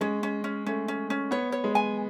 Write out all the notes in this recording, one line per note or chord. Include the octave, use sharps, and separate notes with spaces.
G#3 C#4
C#4
C#4
A3 C#4
C#4
C#4
B3 C#5
C#5
G#3
G#5